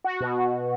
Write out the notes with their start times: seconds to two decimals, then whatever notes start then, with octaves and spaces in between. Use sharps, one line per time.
0.04 F#4
0.21 B2